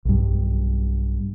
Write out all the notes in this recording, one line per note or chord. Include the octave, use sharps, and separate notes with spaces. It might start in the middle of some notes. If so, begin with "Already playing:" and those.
B1 G2